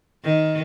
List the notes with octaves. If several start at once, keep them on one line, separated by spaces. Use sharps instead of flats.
D#3